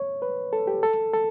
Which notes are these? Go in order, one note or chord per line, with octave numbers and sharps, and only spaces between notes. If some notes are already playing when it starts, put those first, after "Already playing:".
Already playing: C#5
B4
A4
G4
A4
A4